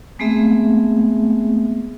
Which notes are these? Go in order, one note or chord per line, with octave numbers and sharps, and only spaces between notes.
G#3 A3 B3 C4 G#4 E5